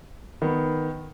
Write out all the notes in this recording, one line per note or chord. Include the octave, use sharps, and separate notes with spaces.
D#3 B3